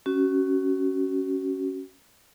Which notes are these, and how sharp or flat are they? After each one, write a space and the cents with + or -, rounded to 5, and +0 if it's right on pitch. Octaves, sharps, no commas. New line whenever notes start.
C#4 +0 F#4 +30